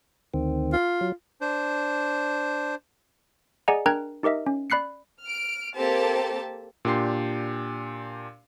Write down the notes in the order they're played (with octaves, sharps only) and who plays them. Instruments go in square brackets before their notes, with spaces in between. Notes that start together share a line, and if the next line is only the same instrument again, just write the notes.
[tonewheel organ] D2 D#3 C4
[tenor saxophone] F4
[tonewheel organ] F#3
[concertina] D4 C5
[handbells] G#4 D5 D#5 F#5 G#5 A#5
D4 A#4 G5 A#5 F#6 G#6
D#4 G4 A#4 D#5 E5
C#4
D5 B5 F#6 C7 C#7
[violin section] F6 D7
A#3 C4 G4 A4 A5
[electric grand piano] A#2 D4 G4 C6 C7